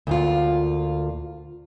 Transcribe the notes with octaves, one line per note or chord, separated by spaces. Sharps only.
D2 A#2 F4